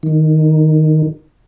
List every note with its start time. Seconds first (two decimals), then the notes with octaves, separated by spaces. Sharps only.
0.03 D#3